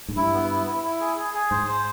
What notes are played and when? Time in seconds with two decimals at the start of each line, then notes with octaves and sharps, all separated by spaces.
0.09 G#2
0.16 G2 E4
0.33 B3
0.50 E4
0.66 E4
0.83 E4
1.00 G#4
1.17 G#4
1.34 G#4
1.51 G#2 C5
1.68 C5